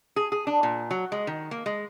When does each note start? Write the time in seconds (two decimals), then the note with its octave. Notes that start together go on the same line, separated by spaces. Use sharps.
0.16 G#4
0.32 G#4
0.47 D4
0.63 A#2
0.91 F#3
1.12 G#3
1.27 D#3
1.51 A#3
1.66 G#3